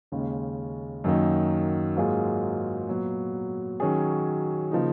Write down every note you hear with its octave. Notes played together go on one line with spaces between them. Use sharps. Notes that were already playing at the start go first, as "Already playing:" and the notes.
D#2 C#3 G#3 C#4
F#2 D#3 F#3 A#3 D#4
G#2 F#3 A#3 F4 G#4
A#2 F#3 B3
D#3 F#3 C#4 G#4
C#3 F3 A#3 D#4